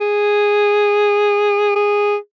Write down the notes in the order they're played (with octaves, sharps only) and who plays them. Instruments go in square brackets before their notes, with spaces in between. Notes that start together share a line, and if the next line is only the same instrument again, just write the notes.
[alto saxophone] G#4
G#4